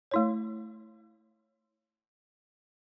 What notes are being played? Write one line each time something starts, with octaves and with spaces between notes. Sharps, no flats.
A3 E4 C#5